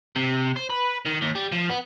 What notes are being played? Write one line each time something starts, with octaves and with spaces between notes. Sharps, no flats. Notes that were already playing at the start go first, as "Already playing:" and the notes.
C3
C5
B4
D#3
D#2
G3
F3
B3